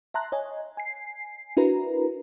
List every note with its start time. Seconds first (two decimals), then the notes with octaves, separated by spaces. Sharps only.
0.14 E5 A5 A#5 C6 F#6
0.32 C#5 D#5 G#5
0.77 G#5 C7
1.57 D4 E4 F#4 A#4 B4 A#5